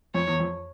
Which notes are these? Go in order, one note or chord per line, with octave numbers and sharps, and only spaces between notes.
F2 C#5
E2
F2